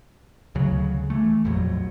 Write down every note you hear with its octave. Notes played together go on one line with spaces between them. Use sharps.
D2 C#3 F#3
E3 A3
A#1 F2 F#3